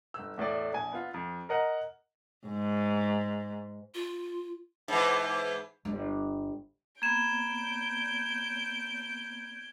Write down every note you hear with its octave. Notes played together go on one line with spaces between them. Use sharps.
G1 E6
E2 A2 A4 D5
A#1 G#5
B3 F4
F2
A#4 D#5 F#5 A#5
G#2
F4
G#2 E3
G1 G3
A#3 B3 G6 G#6 D7 E7